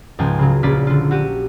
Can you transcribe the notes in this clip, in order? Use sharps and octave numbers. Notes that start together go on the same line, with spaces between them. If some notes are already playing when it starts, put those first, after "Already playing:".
C#2 G#2 F3 G5 G#5
C#3 F#3
A#1 C#3 F4 D5 B6
D3 F4
F#4 G4 D#7